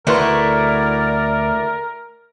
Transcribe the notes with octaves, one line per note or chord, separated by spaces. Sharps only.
D2 A3 E4 F#4 A#4 B4 D5 C6